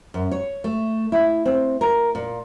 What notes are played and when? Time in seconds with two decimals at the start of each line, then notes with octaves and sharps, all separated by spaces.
0.14 F#2
0.31 C#5
0.64 A3
1.12 E4
1.46 C4
1.81 A#4
2.15 A#2